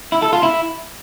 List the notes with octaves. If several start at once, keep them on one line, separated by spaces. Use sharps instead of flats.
E4
A4
F4
E4